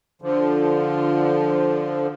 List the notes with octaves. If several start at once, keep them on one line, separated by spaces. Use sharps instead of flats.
D3 F3